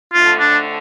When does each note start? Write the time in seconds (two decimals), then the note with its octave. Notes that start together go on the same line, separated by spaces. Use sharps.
0.14 F2 D3 A3 F4
0.40 D4